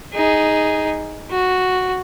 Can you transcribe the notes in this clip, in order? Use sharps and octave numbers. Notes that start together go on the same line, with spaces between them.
D#4 G#4
F#4